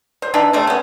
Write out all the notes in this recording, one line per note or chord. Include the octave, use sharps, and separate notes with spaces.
C5
E3 D4 D#4 B5
C3 A3
B3 C#4